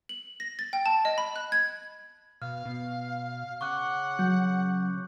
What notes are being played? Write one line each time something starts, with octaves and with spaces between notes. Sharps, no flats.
F#7
A#6
A6
G5
A5
D#5
B5
F#6
G#6
B2 F5 F6
B2
C#3 F#5 C#6 D6 F#6
F#3 G6